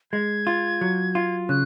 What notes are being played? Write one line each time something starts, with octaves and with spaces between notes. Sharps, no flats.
G#3 G#6
F4
F#3
F4
C#3 F#6